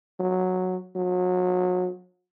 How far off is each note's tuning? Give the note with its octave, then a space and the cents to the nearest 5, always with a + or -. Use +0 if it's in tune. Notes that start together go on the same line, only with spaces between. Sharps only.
F#3 -5
F#3 -30